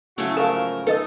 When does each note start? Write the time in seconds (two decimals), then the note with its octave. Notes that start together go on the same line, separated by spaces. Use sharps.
0.18 C#3 F#3 A3 E4 F#4 F#5
0.37 G#2 F3 A4 A#4 F5 A5
0.87 D#4 A4 B4 D#5 E6